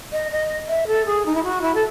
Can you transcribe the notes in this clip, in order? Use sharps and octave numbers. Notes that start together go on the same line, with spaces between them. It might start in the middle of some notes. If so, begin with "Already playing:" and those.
D#5
D#5
E5
A4
G#4
D#4
E4
F#4
E4
A4